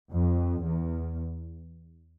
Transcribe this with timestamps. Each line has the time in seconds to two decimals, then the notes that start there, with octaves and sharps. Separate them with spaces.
0.12 F2
0.63 E2